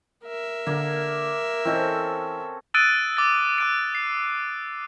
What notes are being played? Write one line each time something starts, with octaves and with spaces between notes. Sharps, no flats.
A#4 E5
D3 A#3
E3 C4 C#4 A4 D#5
D#6 E6 F#6 A6 D7 D#7
D6 A6
D6 F#6 D7
C7